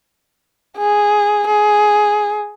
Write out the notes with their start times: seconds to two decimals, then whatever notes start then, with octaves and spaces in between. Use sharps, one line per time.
0.78 G#4
1.47 G#4